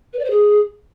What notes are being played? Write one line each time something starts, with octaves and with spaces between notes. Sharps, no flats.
B4
D5
C5
G#4